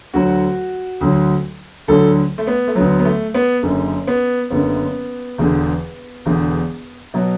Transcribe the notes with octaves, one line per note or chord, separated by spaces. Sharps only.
D2 D3 F#3 F#4
D2 D3 F#3
D2 D3 F#3 A4
A3
B3
A3
D2 D3 F#3 B3
B3
A3
B3
F#1 F#2 D3
B3
F#1 F#2 D3 B3
E1 E2 D3
E1 E2 D3
B2 F#3